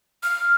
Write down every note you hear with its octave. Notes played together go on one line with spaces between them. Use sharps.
F6